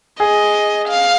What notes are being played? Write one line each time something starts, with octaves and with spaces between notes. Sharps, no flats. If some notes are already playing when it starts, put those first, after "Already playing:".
G#4 D#5
F5